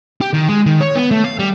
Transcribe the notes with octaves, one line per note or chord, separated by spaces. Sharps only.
G4
D#3
G#3
D#3
C#5
B3
A3
F5
G3